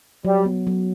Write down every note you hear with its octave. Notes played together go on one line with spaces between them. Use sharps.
F#3 G3
B3
F#3